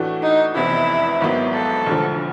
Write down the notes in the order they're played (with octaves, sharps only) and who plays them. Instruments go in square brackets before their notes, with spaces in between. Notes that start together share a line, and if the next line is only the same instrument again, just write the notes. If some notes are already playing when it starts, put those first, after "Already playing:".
Already playing: [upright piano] A2 E3 A3 D4 F#4
[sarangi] D#4
[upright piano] F1 E2 C3 E3 [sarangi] E4
[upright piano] G#1 G#2 D#3 F#3 B3
[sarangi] A4
[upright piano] E1 D2 D3 F3